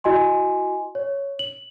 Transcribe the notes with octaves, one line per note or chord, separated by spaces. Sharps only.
E4 F#4 D#5 G#5 C6
C#5
F#7